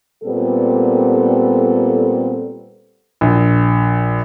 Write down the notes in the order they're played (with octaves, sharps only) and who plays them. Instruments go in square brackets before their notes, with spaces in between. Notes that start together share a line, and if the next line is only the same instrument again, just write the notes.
[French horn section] A#2 G3 B3 C4 A4
[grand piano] A#1